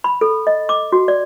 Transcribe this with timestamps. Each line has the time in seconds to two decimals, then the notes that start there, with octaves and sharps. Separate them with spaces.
0.04 B5
0.21 A4
0.47 D#5
0.69 D6
0.92 F#4
1.08 D5